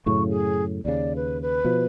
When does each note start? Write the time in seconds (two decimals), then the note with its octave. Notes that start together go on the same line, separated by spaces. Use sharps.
0.06 F#2 A2 C#3 C#6
0.30 G#4
0.85 D#2 C#3 D5
1.16 B4
1.42 B4
1.65 B2 F3